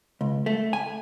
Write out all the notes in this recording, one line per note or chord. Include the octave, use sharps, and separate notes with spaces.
C#2
A3
G#5